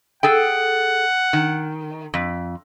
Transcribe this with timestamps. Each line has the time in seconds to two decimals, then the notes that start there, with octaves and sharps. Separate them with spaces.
0.23 G#4 A4 F#5 G5
1.33 D#3
2.14 F2